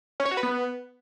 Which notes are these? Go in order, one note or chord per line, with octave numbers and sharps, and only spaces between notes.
C#4
C#5
F#4
B4
B3